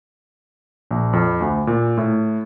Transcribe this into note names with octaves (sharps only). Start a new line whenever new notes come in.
A#1
F2
D2
A#2
A2